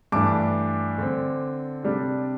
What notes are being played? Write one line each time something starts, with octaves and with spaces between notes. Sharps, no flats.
G2 E3 A3 D4 A5 D6
D3 C4
C3 G3 D4